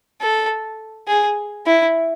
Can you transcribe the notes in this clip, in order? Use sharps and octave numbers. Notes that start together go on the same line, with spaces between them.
A4
G#4
E4